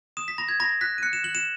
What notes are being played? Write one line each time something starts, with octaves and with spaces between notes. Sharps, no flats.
D#6 E7
B6
B5 A#6
G#6
B5 A#6
F#6 B6
D#7
F#6 C#7
E7
F#6 F#7
E7